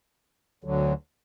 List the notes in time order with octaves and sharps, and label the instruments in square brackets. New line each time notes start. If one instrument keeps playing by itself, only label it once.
[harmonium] D2 D3 F#3